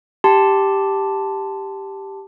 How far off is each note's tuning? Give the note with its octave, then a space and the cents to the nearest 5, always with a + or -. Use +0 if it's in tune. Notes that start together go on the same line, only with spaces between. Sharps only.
G4 +0 A5 +0 C6 -20